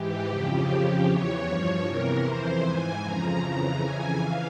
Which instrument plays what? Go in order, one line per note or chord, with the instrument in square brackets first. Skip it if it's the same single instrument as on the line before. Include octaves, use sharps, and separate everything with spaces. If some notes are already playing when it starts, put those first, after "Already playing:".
Already playing: [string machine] G#2 E3 G4
F2 C#3 F3
F2 C#3 F3 G4
E2 E3 C#5
G2 F3 C#5
E2 C3 E3 A#4
F2 E3 C5
G#2 E3 G#5
F2 C#3 F3 A#5
F2 C#3 E3 A#5
F2 C#3 E3 G#5
E3 F5